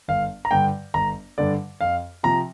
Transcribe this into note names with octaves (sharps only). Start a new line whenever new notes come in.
G1 F5
A#5
G2 D3 G5
G1 A#5
G2 D3 D5
F2 F5
C3 F3 A#5